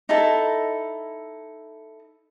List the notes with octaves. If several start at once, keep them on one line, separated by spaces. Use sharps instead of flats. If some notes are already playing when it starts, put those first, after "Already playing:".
D#4 E4 A4